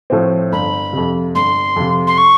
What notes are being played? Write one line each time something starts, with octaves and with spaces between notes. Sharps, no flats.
A2 F3 A3 C4
G1 B5
F2 C3
G1 C6
F2 C3
C6
C#6